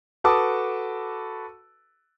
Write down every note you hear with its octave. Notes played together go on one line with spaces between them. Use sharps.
F#4 A4 B4 A5 D6 D#6